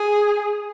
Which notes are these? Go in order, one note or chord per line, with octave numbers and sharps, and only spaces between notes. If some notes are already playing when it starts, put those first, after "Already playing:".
Already playing: G#4